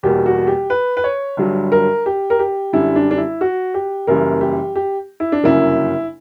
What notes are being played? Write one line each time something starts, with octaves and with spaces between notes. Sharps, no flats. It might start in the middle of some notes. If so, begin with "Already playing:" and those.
E2 B2 G3 A#3 G4
F#4
G4
B4
B4
C#5
G1 G2 F#3
A#4
G4
A#4
G4
F#2 D3 G3 E4
D4
D4
E4
F#4
G4
F#1 F#2 E3 G3 A#3 A#4
G4
G4
E4
D4
G1 F#2 C#3 F#3 A#3 E4